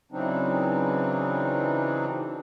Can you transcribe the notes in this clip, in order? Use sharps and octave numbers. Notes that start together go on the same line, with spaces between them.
C#3 E3 F#3 C4 D4 D#4